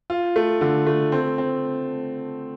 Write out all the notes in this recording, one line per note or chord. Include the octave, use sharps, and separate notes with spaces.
F4
A3
D3
A3
C4
C4